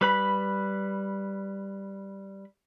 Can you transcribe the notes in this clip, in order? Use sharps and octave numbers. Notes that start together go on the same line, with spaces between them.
G3 B4 B5